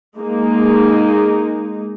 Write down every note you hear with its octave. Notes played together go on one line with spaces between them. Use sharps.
G#3 A#3 D#4